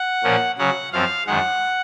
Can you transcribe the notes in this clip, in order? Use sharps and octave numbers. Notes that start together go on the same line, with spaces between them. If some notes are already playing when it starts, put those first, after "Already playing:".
Already playing: F#5
A#2 F3 A#3 C#4
C#3 F#3 C#4 F#5
F#2 F3 C4 F5
F#2 D#3 G#3 F#5